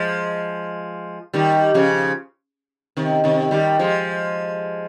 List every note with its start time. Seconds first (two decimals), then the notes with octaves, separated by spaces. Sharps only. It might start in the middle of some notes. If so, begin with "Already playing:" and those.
Already playing: F3 G#3
1.34 D#3 G3
1.74 C#3 F3
2.97 C3 D#3
3.24 C3 D#3
3.51 D#3 G3
3.79 F3 G#3